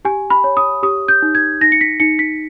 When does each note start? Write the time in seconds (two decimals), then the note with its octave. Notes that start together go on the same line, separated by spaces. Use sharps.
0.05 G4 G#5
0.30 B5
0.44 C#5
0.57 D#6
0.83 G4 D#6
1.08 G6
1.22 D#4
1.35 G#6
1.61 D#4 A#6
1.72 C#7
1.81 B6
2.00 D#4 C#7
2.19 B6